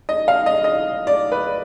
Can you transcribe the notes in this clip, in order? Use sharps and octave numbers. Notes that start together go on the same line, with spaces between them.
D#5
F5
D#5
D#5
D5
B4